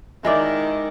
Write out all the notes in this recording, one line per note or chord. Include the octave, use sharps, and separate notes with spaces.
D#3 G#3 E4 D5